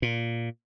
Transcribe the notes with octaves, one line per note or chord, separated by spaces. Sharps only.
A#2